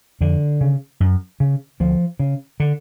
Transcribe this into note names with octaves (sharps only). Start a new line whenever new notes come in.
F2 D3
C#3
F#2
C#3
D2 F3
C#3
D3